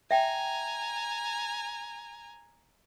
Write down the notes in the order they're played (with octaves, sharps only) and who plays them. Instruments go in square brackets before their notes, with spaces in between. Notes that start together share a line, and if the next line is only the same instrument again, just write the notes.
[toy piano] E5 G5 [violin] G#5 A#5